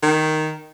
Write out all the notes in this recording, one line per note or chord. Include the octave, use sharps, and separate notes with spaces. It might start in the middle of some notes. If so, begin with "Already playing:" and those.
D#3